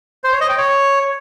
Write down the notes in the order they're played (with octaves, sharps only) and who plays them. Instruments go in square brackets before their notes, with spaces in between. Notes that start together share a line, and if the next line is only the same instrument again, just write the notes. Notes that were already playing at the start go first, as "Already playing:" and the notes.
[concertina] C5
C#5
D#5
G5
C#5